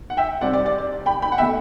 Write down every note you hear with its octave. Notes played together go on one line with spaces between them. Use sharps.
F#5
E5 G5
C2 C3 G3 C4 D5 F#5
D5
D5
D5
G5 B5
G5 B5
F#5
B2 A3 E5 G5